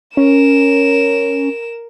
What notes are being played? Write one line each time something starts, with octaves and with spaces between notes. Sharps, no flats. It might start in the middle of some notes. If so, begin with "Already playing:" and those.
C#4 A#4 E7